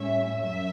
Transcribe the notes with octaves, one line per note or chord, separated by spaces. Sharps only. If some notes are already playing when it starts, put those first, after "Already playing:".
Already playing: A2 G3 C#4 E5
F#2 E5